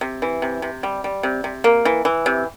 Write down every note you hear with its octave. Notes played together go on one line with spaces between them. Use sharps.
C3
E3
C3
C3
G3
G3
C3
C3
A#3
E3
E3
C3